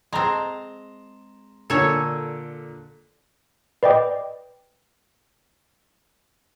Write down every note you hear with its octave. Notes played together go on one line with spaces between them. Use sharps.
G#3 C4 A5 A#5 C6
A#2 D3 A4 C#5 G#5
B4 D5 D#5 G5 D6